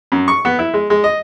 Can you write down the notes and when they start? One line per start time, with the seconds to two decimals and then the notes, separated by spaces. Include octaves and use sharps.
0.12 F#2
0.28 C#6
0.45 B3
0.59 E4
0.74 G#3
0.90 G#3
1.04 D#5